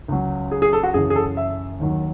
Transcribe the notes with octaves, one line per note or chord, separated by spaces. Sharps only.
C#2 C#3 F#3
G#4
G#4
A4
F#4
F#2 C#3 E3 G#4
G#4
A4
E5
D#2 D#3 F#3